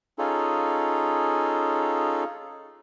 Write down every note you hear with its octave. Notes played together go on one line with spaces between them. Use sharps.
C#4 D#4 F4 G#4 A4